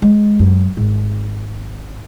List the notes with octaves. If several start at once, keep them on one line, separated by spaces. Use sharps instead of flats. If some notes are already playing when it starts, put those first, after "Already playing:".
G#3
F#2
G#1